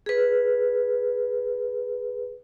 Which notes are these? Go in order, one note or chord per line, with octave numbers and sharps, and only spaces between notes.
G#4 B4